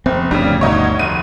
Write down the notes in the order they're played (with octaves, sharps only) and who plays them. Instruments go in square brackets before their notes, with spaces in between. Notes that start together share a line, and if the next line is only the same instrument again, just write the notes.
[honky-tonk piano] F1 [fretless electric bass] C4
[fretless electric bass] G1 D2 D4 [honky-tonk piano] C#3 G3
[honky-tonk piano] B2 D#4 C#5
F1 D#7